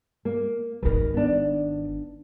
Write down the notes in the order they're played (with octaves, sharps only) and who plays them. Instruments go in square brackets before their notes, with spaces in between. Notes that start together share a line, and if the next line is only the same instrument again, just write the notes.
[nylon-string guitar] A#3
[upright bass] G#1 D#3 [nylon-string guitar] A#4 B4
[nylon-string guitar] B3 D4